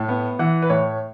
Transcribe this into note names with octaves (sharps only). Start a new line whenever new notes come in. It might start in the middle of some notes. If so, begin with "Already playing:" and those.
Already playing: A2
B3
E3 F#5
B4
A2 C#5